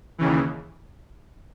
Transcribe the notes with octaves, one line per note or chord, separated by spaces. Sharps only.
D#2 C#3 E3